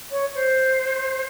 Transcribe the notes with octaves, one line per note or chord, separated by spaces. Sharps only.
C#5
C5